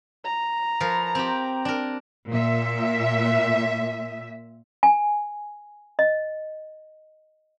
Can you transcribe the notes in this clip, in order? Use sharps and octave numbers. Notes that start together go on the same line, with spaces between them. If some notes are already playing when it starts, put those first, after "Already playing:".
A#5
F3 A#4 B4
C4 G4
D4 A#4
A#2 E5
G#5
D#5